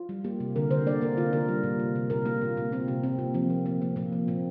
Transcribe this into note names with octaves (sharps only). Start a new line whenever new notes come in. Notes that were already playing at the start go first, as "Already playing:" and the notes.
Already playing: F4
G3
A#3 G4
C3
D3 A#4
D3 C5
A#3 D5
A#3 A#4
D3 F4
D3 A#4
G3
A#2
C3
C3
A#2 A#4
A#3 F4
A#2
A#2
A#3 C4
C3
A#3 C4
A#2
F3 C4
A#3
A#3 C4
A#3
A#2 A#3
F3
A#2 C4